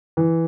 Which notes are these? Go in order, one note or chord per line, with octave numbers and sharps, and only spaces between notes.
E3